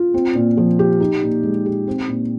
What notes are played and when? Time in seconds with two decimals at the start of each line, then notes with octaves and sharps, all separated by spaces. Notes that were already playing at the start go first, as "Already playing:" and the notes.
Already playing: F4
0.14 C4
0.35 A#2
0.57 F3
0.79 G4
1.00 D#4
1.22 A#2
1.43 G#3
1.66 G4
1.87 C4
2.08 A#2